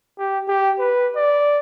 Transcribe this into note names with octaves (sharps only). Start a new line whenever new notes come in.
G4
G4
B4
D5